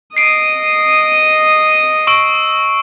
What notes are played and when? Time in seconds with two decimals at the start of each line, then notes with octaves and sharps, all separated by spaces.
0.17 D#5 D#6 C7 D7 D#7
2.07 C#6 E6 D7